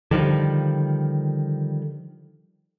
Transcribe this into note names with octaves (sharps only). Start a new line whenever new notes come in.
D3 D#3 F3 G3